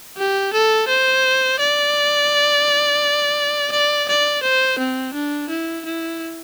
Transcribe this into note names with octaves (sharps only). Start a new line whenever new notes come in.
G4
A4
C5
D5
D5
D5
C5
C4
D4
E4
E4